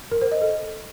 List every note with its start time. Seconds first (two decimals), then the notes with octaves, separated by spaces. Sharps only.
0.11 A#4
0.21 C5
0.32 D#5
0.42 A4